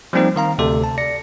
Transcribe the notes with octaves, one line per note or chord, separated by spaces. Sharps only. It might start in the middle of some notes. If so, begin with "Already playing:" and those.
F3 G3 A#3 C4 D#4 C5
D#3 F5 A#5
D2 C3 A4
A5
D5 A#6 C#7